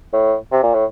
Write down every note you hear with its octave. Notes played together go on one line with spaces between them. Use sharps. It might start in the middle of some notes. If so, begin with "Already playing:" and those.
A2
C3
A#2
A2